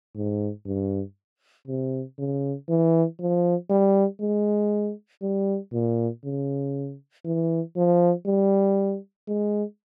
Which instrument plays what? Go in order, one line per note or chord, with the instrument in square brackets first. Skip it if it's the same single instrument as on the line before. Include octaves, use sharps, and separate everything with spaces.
[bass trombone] G#2
G2
C3
C#3
E3
F3
G3
G#3
G3
A#2
C#3
E3
F3
G3
G#3